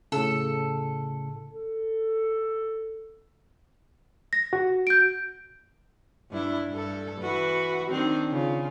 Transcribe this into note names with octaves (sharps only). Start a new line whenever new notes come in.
A2 C#3 A4
A4
A#6
F#4
G6 D7
G2 D4 E4
G2 A4
E3 F#4 B4
D#3 C4 D4
C#3 F4